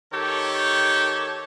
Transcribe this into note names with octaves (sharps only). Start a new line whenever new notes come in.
D#3 G4 A4 C#5